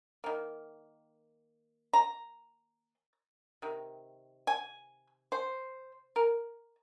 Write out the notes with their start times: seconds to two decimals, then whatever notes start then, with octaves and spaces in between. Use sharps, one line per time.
0.24 D#3 A#3
1.93 A#5
3.62 C3 D#3
4.47 G#5
5.32 C5
6.16 A#4